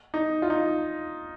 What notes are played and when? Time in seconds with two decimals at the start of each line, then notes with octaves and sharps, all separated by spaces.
0.14 D#4
0.42 F4
0.50 D#4